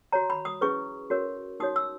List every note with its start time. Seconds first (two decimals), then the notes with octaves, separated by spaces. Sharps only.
0.12 F#4 C#5 A#5
0.30 B5
0.45 D#6
0.61 C#4 E4 G#4 B4 C#6
1.10 C#4 F#4 A#4 C#5
1.60 D#4 F#4 C#5 D#6
1.76 E6